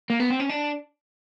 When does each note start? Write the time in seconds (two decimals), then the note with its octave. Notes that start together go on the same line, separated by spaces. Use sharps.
0.10 A#3
0.20 B3
0.30 C4
0.40 C#4
0.49 D4